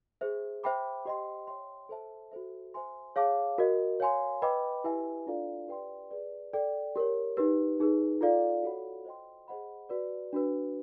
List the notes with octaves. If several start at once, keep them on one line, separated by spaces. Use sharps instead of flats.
G#4 C5 E5
C5 E5 G5 B5 D6
G4 C5 D#5 G5 C6
C#5 E5 G5 C6
A4 C5 E5 A5
F#4 A4 C5 E5
C5 E5 G#5 C6
G#4 C#5 F5 A5 D6
F#4 A#4 D#5
C#5 F5 G#5 C6
B4 D#5 G5 B5 D6
E4 G4 B4 E5 G#5
D4 F4 A4 D5 F5
G4 B4 D5 G5 C6
G#4 B4 D5
A4 D5 G5
G4 A#4 C#5
D#4 G4 B4
D#4 G#4 B4
F4 A4 D5 F5
F#4 A4 C#5 F#5 B5
C5 D#5 G5 C6
G#4 C5 D#5 F#5 B5
F#4 B4 D5
D4 F#4 B4